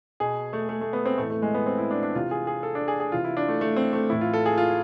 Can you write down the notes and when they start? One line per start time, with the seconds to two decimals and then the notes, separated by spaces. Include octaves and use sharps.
0.20 B2 G#4
0.53 A3
0.69 A3
0.81 A3
0.93 B3
1.06 C4
1.18 A2 E3 A3
1.30 A3
1.42 G#3
1.54 B3
1.66 C4
1.78 E4
1.91 D4
2.03 D4
2.15 C3 E3 F4
2.31 G#4
2.47 G#4
2.63 A4
2.75 D4
2.88 G#4
3.00 G#4
3.12 C3 E3 F4
3.24 E4
3.37 D4
3.48 A3
3.61 A3
3.76 C4
3.93 A3
4.09 A2 E3 E4
4.21 F4
4.34 A4
4.46 G#4
4.58 F4